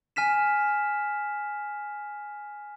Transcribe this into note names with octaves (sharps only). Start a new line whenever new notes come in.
G#5 F6 B6 E7